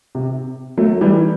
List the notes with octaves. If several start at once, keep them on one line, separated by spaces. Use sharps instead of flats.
C3
F#3 A3
E3 G3